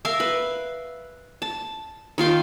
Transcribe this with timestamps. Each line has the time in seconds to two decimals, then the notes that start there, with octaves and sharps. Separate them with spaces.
0.05 A#4 E5 F5
0.20 B4
1.42 A5
2.18 D#3 F4 F5 G5